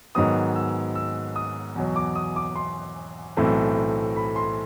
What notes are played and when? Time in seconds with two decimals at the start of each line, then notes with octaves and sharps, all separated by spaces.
0.15 G#2 D#3 F#3 B3 D#6
0.55 E6
0.95 E6
1.36 D#6
1.76 E2 B2 F#3
1.96 D6
2.15 D#6
2.36 D6
2.56 C6
3.37 B1 A2 E3 A3 C4
4.17 B5
4.36 C6